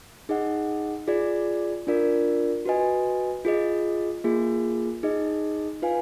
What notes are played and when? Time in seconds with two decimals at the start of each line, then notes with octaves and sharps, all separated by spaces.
0.29 D#4 G#4 D#5 F#5
1.08 F4 G#4 D5
1.87 D4 F4 A#4 D5
2.66 F#4 B4 D#5 G#5
3.45 F4 G#4 D#5
4.24 A#3 F4 G#4
5.03 D#4 G#4 D#5
5.82 F4 B4 F5 G#5